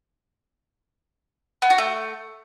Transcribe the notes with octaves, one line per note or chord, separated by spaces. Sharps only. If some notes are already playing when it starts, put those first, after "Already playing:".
B3
F#4
A3